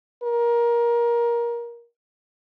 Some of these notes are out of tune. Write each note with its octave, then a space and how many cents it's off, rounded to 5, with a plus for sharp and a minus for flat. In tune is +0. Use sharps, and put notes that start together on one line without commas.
A#4 +20